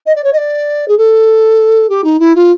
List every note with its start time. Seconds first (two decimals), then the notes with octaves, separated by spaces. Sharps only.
0.06 D#5
0.16 D5
0.24 C#5
0.33 D#5
0.38 D5
0.88 G#4
0.98 A4
1.89 G4
2.04 D#4
2.20 E4
2.35 F4